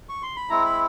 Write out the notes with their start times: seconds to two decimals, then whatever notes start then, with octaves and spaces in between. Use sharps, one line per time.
0.09 C#6
0.23 C6
0.36 B5
0.49 G#3 C4 E4 A#5
0.66 B5